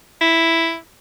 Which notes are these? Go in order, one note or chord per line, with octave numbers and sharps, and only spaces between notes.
E4